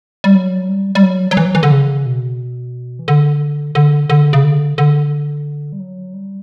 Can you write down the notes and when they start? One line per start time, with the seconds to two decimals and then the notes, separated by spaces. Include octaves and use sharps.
0.24 G3
0.35 F#3
0.69 G3
0.95 G3
1.03 F#3
1.31 F#3
1.37 E3
1.46 F#3
1.55 E3
1.63 D3
1.72 C#3
2.06 B2
2.99 E3
3.08 D3
3.75 D3
4.10 D3
4.33 C#3
4.44 D3
4.78 D3
5.73 G3
5.80 F#3
6.14 G3